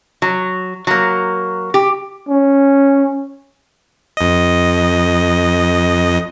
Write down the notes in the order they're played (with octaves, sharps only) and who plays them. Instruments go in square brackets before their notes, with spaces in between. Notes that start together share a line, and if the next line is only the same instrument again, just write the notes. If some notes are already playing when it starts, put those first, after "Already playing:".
[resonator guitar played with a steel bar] F#3
F#3 A#3
G4
[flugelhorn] C#4
[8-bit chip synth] F2 D#5